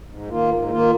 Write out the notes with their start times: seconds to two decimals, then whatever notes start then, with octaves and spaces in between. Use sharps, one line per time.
0.09 G#2
0.29 D#3 A#3 F4
0.50 G#2
0.70 D#3 A#3 F4